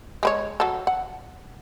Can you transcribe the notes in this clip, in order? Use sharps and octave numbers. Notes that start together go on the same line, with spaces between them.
G#3 B4 C#5
F#3 A4
F#5